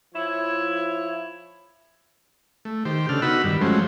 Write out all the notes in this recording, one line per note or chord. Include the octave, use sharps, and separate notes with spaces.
F3 E4 C#5
A3
D#3 G4 C5
C#3 D4 A4 F6
B3 D#4 F#4 B5 E6
G2 D#3 G3
F3 F#3 G#3 A3 C#4 C5